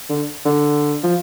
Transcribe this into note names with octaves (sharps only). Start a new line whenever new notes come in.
D3
D3
F3